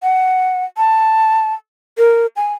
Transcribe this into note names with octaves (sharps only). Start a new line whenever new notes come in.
F#5
A5
A#4
G#5